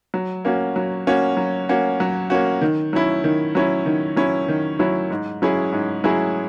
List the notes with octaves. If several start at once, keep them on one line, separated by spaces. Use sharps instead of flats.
F#3
A#3 C#4 F#4
F#3
A#3 C#4 F#4
F#3
A#3 C#4 F#4
F#3
A#3 C#4 F#4
D#3
F#3 C#4 E4
D#3
F#3 C#4 E4
D#3
F#3 C#4 E4
D#3
F#3 C#4 E4
G#2
F#3 C#4 E4 G#4
G#2
F#3 C#4 E4 G#4